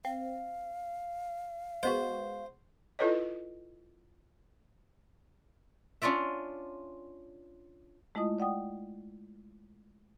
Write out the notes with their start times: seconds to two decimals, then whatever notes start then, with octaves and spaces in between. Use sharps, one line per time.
0.05 C4 F5
1.83 G#3 B3 F#4 C5
2.99 E4 F4 A4 B4 C#5 D#5
6.02 C#4 D4 F4 D5 E5
8.15 G#3 A3 E4 F4 D#5 D#6
8.38 D5 F#5 G5 D#6